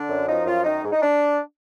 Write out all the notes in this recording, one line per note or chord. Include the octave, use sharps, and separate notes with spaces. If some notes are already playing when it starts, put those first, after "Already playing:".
Already playing: D3 D4
F#2
F3 D#4
F#2 F4
D#3 D#4
G#2
D#4
D4